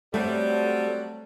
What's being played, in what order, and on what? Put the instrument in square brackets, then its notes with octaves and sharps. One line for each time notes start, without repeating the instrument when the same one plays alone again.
[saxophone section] F#3 G3 [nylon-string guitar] A3 [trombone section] C4 A4